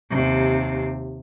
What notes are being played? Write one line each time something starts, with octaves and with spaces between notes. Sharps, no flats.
D#2 C3